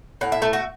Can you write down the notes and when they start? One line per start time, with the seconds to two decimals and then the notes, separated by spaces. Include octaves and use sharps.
0.21 A2 F#5
0.32 E5
0.42 A3 A4
0.53 F#4